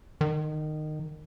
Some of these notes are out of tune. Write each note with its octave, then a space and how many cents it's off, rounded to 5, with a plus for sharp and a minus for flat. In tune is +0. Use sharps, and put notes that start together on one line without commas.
D#3 -20